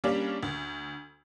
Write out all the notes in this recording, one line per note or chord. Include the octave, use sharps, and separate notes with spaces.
G3 A#3 C#4 D4
D2